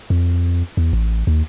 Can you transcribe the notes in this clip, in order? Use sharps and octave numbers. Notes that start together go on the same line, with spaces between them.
F2
E2
A1
D#2